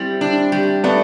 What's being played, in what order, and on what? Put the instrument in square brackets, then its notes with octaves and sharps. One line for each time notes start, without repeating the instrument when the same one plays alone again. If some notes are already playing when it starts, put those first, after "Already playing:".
Already playing: [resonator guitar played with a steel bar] G3 [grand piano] C4 E4
[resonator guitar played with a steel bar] D4
G3
[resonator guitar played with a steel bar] A3 [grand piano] B3 D4